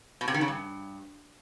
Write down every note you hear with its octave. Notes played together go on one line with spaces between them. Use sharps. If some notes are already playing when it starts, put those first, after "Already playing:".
B2
C3
D#3
C#3
G2